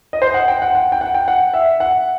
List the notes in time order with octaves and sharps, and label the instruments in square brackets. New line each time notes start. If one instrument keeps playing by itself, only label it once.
[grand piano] D#5
C5
F#5
G5
F#5
F#5
G5
F#5
G5
F#5
E5
F#5